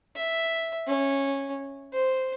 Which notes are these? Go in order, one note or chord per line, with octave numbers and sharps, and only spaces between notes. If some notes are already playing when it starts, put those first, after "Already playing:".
E5
C#4
C5